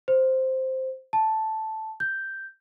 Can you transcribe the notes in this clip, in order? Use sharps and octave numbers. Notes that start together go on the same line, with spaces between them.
C5
A5
G6